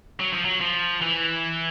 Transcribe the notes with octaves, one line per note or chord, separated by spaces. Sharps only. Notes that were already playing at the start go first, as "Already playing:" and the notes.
F#3
F3
F#3
F3
E3